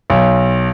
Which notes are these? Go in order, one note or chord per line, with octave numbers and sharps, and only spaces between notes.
B1